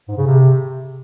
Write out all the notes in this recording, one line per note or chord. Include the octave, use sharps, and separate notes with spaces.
G#2
C#3
C3